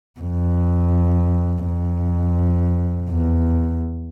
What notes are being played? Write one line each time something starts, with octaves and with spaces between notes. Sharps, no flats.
F2
F2
E2